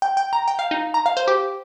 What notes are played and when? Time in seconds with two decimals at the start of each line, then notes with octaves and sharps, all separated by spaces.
0.02 G5
0.17 G5
0.33 A#5
0.48 G5
0.59 F5
0.71 D#4
0.94 A#5
1.06 F5
1.17 C5
1.28 G4